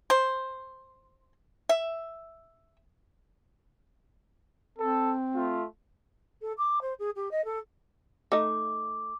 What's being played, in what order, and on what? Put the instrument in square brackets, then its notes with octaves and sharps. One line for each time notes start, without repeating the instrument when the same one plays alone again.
[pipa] C5
E5
[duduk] C4 [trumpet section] A4
[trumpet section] A3 F4
[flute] A4
D6
C5
G#4
G4
D#5
A4
[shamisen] A3 D#4 [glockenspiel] D6